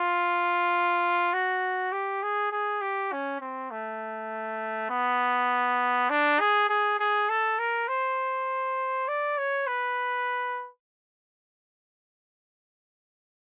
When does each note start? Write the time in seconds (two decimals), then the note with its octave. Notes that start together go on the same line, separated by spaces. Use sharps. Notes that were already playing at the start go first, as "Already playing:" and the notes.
Already playing: F4
1.33 F#4
1.92 G4
2.23 G#4
2.52 G#4
2.81 G4
3.12 C#4
3.41 C4
3.71 A3
4.90 B3
6.10 D4
6.40 G#4
6.70 G#4
7.00 G#4
7.29 A4
7.59 A#4
7.88 C5
9.08 D5
9.38 C#5
9.67 B4